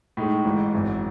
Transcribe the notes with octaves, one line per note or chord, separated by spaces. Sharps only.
A2 G#3 D#4
A1 G#2 E3
G#1 F#2 E3